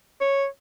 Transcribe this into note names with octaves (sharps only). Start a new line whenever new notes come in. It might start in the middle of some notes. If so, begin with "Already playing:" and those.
C#5